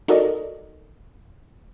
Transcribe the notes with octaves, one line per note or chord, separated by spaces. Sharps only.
D#4 F#4 A4 A#4 D5 D#5